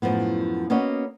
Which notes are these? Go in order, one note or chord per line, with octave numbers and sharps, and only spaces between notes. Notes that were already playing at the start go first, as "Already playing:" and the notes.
F#2 A2 F3 B3
A#3 B3 C#4 F#4 D#5